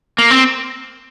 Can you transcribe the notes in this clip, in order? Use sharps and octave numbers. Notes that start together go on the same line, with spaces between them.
A#3
C4